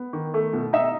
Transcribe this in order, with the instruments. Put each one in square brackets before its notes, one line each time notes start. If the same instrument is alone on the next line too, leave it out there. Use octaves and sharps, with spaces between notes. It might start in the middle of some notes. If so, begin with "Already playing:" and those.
Already playing: [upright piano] B3
D#3
A3
B2
[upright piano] D#4 [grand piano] E5